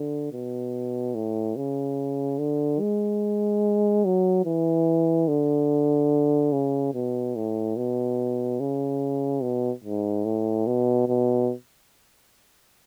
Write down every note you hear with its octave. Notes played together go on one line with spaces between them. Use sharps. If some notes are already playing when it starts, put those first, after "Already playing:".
Already playing: D3
B2
A2
C#3
D3
G#3
F#3
E3
D3
C#3
B2
A2
B2
C#3
B2
G#2
A2
B2
B2